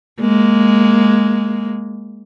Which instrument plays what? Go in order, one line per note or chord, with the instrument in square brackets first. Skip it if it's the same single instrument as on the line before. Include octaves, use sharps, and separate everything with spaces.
[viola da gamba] G#3 A#3